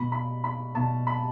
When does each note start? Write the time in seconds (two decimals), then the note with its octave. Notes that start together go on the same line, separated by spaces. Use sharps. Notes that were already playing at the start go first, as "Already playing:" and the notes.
Already playing: B2 B5
0.12 B5
0.44 B5
0.75 B2 A5
1.07 B5